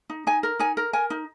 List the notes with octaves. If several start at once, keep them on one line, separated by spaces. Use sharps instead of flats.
D#4
D#4 G#5
A#4
D#4 G#5
A#4
A#4 G#5
D#4